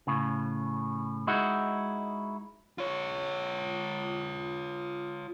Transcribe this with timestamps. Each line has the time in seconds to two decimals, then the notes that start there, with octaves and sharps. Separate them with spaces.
0.07 A2 C#3
1.27 G#3 D#4 E4 F#4
2.78 F4 C#5